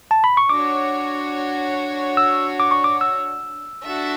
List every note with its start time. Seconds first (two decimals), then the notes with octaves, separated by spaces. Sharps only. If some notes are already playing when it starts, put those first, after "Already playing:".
0.11 A5
0.24 B5
0.37 C#6
0.49 D4 F#4 C#5 D6
2.17 E6
2.60 D6
2.71 C#6
2.84 D6
3.01 E6
3.85 D4 F#4 A4 E5 A5